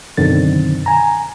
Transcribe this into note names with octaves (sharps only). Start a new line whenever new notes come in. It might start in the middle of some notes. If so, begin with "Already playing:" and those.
F#2 B2 D3 D#3 C4 A6
G#5 A#5